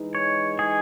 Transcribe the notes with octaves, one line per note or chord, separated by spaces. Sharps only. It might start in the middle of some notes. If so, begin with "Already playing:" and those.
Already playing: E3 G#3 D#4
C#5
G#4